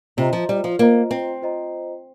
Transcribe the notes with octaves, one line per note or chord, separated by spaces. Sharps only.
C3 F4 C5 D#5 A#5
F3
G3
F3
A#3 F4 C5 D#5 A#5
C4
F4 C5 D#5 A#5